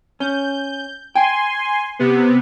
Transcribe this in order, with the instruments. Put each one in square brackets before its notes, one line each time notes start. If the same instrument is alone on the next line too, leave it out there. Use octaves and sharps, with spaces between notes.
[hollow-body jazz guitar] C#4 [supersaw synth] G6
[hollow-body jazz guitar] G5 [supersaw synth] G#5 C6
[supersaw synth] C3 B3